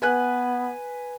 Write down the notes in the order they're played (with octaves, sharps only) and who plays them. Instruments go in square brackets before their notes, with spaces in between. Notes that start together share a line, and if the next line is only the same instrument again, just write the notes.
[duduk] B3 [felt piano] B4 G#5 F#6